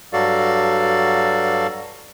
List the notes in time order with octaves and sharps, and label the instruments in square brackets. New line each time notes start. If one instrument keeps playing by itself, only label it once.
[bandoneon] G2 F#3 F#4 A4 D5 F5